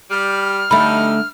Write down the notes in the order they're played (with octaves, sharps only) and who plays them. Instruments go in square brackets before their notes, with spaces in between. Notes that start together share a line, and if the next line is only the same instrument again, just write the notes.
[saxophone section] G3 [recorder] F6
[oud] D3 A3 [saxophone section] G3 D#4 [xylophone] B5